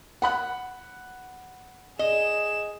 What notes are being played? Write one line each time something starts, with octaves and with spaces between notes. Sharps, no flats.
F#5 B5 F#6
G#4 D#5 E7